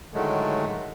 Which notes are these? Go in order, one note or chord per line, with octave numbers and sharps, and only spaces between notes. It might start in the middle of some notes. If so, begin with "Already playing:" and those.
A2 D3 D#3 F#3 G#3 A3